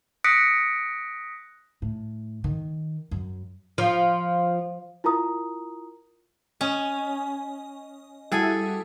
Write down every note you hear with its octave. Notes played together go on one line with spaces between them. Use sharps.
D#6 F#6 A#6 B6 C#7 D7
A2
D#3
F#2
F3
E4 F4 A#4 A#5 D#6
C#4 D#5
G3 E4 F#4 G#4 A4 G#5